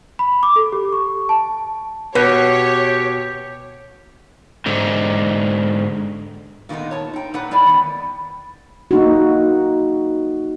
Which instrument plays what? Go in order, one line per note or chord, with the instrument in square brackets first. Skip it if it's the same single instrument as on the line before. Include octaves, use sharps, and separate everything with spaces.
[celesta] B5
D6
A4
G4
C#6
A5
[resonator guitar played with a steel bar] B2 [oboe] G4 [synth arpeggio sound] B4 [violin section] C#5
[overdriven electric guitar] G#2 D3
[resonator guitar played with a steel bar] A#2 D#3 G#3 B3 D#4
C#5 A5
D#4 G5
A#2 D#4 B4 F#5
G3 G#3 E4 D5 G5
D#3 B3
[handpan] A#3 D#4 F#4